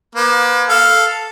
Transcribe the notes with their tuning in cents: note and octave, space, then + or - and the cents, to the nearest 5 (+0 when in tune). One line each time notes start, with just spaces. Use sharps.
A#3 +45 B4 +30
A4 +0 F5 +0